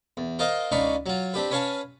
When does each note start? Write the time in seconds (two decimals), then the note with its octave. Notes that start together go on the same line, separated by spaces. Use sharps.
0.17 E2
0.39 F4 A#4 C5 D#5 F5
0.72 C#2 D4 D#4 B4 F5 C#6
1.06 F#3 F4
1.34 C4 D4 G4 B4
1.51 C#4 B4 C#5 F5 G#5 A5